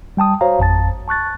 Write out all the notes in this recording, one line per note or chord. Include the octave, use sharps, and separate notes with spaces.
G3 G5 A5 D#6
F#4 C5 C#5 F5 A#5
G#1 F2 A5 A6
A5 C#6 F#6 A6